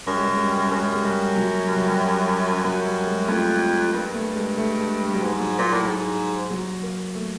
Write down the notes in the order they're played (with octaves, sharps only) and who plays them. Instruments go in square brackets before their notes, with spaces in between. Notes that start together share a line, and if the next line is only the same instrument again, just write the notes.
[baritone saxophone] F#2 [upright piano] G3
[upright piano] G#3
G3
G#3
G3
G#3
G3
[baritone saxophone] F#2 [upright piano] G#3
[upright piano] G3
G#3
G3
F#3
G3
F#3
G3
[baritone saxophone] F#2 [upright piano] F#3
[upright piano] G3
G#3
[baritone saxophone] F2 [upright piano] A3
[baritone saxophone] G2 [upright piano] A#3
[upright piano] A3
G#3
A3
G#3
G3
F#3
[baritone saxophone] G#2
[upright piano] F#3
[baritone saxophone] A#2
A2
G#2
[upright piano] F#3
A#3
A3